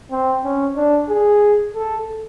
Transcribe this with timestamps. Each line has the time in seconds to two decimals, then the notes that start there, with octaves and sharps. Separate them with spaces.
0.11 C4
0.44 C#4
0.76 D4
1.09 G#4
1.74 A4